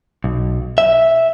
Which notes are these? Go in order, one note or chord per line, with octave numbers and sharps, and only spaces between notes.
B1
E5